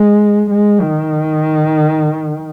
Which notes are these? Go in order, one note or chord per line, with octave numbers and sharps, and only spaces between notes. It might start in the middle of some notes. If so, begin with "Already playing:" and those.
Already playing: G#3
G#3
D#3